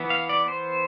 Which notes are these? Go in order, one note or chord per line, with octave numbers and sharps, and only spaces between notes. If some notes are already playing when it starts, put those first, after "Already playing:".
Already playing: E3 B3
F5
D5
C5